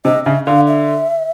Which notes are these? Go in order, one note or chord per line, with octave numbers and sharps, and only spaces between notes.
C3 D#5
C#3 E5
D3 F5
E5